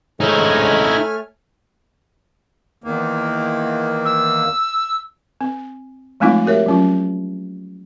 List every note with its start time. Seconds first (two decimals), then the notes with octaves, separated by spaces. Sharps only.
0.20 G#2 A3 D#4 E4 C#5 G#5 F6
2.84 E2 D#3 A#3
4.05 E6
5.41 C4
6.20 F3 G#3 A3 C4 D#4 F4
6.45 F#4 G4 A#4 C#5 E5
6.66 F#3 C#4 F4